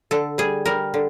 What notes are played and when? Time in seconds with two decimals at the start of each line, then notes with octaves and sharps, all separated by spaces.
0.11 D3 A4
0.38 G3 G#4
0.65 G3 A#4
0.94 D3